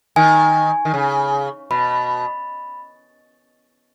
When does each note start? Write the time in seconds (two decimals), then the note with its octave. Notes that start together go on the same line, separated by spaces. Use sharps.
0.16 D#3 G#5
0.85 D#3
0.94 C#3
1.71 B2 B5